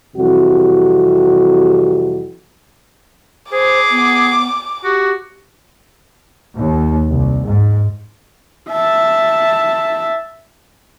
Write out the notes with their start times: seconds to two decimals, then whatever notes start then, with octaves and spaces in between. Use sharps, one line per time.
0.16 F2 C3 E3 G3 F#4
3.52 G#4 C5 D6
3.91 B3
4.84 F#4 G4
6.56 D#2
7.10 C2
7.47 G#2
8.70 E5 A5